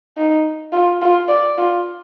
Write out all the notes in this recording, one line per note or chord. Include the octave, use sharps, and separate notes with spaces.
D#4
F4
F4
D5
F4